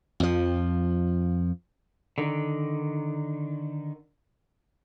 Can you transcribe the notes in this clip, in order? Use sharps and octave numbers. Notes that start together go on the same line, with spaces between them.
F2 F3
D3 D#3